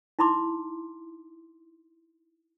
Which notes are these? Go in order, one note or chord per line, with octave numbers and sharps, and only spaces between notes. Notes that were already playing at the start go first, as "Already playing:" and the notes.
D#4 E4 B5 C6 D6